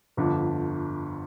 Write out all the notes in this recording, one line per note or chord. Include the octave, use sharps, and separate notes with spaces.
G1 F2 D3